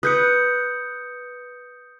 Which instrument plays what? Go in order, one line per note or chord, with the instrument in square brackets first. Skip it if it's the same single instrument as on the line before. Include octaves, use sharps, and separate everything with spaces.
[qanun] B4 [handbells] D#6 G6 C#7